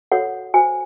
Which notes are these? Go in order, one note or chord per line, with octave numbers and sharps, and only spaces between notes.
F#4 A4 C#5 F#5
F#4 C5 G#5